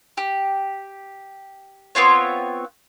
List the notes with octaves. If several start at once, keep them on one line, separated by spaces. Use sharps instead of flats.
G4
B3 C4 F4 C#5